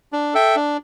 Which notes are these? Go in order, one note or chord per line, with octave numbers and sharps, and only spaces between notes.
D4
A4 E5 G5
D4